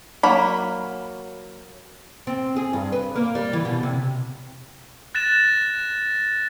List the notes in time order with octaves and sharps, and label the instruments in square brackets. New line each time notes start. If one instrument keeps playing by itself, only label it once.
[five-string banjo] F#3 A#3 B5
[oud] C4
G#4
G2
B4
A#3
G3
E3
B2
C3
[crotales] F#6 A6 A#6 E7